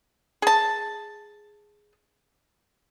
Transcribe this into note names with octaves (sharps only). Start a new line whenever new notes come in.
G#4 A5